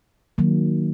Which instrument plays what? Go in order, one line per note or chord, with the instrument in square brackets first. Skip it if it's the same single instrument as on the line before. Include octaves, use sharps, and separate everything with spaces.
[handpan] D#3 F#3 A#3